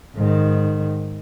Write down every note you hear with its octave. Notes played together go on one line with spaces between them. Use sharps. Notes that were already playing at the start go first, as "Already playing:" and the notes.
G#2 D#3